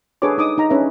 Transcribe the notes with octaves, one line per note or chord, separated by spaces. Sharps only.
D4 G#4 A4 B4 C#5 D6
D#4 D6 D#6
D#4 A#5
C#4 D4 G#4 B4 C#5 E5